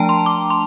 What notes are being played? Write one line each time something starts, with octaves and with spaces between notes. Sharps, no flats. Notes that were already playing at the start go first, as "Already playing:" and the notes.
Already playing: F3 A3 D4 G5 A5 A#5
C6
D6
C6